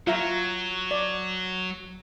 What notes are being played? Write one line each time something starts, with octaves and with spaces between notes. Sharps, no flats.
F#3 F4 E5 A#5
D5